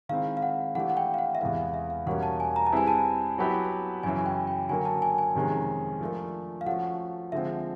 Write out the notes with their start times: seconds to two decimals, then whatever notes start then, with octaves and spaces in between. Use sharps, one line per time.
0.09 D#3 G#3 C4 E4 F5
0.37 F5
0.42 F#5
0.75 E3 A3 D4 G4 F#5
0.90 F#5
0.97 G5
1.14 F5
1.19 F#5
1.35 E5
1.41 E2 C3 E3 G#3 B3 F5
1.57 F5
1.74 E5
1.90 F5
2.07 E2 B2 G3 A#3 C#4 F#5
2.23 A5
2.40 G#5
2.56 A#5
2.67 A5
2.72 G3 C4 E4 G#4 B4 G#5
2.88 A5
3.38 F#3 B3 E4 G4 B4
4.03 F#2 C#3 E3 G#5
4.26 G5
4.47 G5
4.69 D3 F#3 A#3 G#5
4.85 A5
5.02 G#5
5.18 G#5
5.35 F2 C3 D#3 G#3 C#4
6.01 F3 A3 D4 F4 A#4
6.61 F5
6.66 F3 A3 C#4 F#4 F#5
7.32 D3 F3 G#3 C4 E5